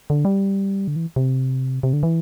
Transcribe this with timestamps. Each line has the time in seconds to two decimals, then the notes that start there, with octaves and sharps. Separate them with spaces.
0.10 D3
0.25 G3
0.88 D3
0.96 E3
1.16 C3
1.83 C3
1.93 D3
2.03 E3